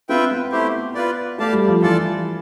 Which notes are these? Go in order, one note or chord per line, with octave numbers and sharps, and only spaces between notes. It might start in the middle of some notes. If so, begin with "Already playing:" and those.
C4 F4 B4 E5 G5
B3
A3 E4 G4 C5
F4 B4 D5
A3 G4 D5 F5 A5
G3
F3
E3 F4 A4 D5 A5